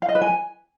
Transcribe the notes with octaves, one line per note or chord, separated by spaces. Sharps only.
F5
D#5
B4
G#5